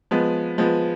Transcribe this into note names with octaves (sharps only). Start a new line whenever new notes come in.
F3 G#3 B3
F3 G#3 B3